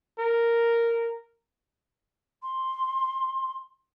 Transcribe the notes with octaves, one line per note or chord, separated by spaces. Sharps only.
A#4
C6